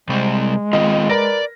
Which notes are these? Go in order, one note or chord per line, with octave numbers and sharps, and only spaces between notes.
C3 G3 G#3 C4
D#3 C4 F4 D#5
A#4 B4 D5 A#6